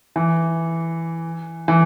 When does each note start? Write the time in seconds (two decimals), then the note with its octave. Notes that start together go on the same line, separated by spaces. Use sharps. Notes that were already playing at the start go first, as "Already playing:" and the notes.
0.16 E3
1.68 E3